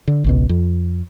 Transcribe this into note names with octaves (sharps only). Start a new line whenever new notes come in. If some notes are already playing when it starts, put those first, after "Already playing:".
D3
G#1 C#2 B2
F2